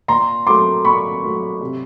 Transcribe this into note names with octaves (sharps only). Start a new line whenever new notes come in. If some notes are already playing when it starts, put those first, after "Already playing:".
A#2 A#5 C6
F#3 A3 C6 D6
A#2 B5 C#6
F#3 A3
C3